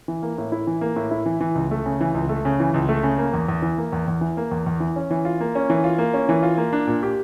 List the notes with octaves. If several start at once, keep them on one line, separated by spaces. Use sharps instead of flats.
E3
A#3
A2
E4
E3
A#3
A2
E4
E3
E3
C#2
A3
C#3
E3
C#2
A3
C#3
E3
C#2
A3
C#3
A#3
E2
E2
E3
A#3
E2
E2
E3
A#3
E2
E2
E3
C#4
E3
F4
A#3
C#4
E3
F4
A#3
C#4
E3
F4
A#3
D4
A#2
G4